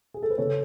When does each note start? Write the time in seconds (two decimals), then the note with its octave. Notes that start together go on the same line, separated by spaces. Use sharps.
0.14 G#4
0.23 A4
0.30 B4
0.38 C#3 A4 C#5